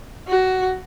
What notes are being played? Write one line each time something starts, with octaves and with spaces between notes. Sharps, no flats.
F#4